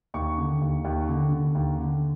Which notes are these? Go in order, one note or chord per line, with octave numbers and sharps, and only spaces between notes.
D#2 C#6
D3
D#2
D#2
D3
D3
D#2
D3